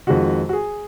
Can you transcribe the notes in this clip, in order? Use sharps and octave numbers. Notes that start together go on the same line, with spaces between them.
F2 D#3 G#3 F#4
F#4
G#4